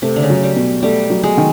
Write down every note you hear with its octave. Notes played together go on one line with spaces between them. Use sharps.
C3 A3
D3
C#3
F#3
G3
B2
G3 A3
F#3
G#3
D#3